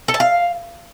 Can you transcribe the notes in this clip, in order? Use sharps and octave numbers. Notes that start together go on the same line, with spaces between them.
A4
A5
F5